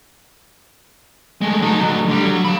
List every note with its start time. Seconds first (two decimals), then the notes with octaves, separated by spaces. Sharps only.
1.41 G#3 A3
1.62 F#3 D#4
1.80 D2 F#3
2.08 D3 G3
2.26 F#3
2.45 F5 B5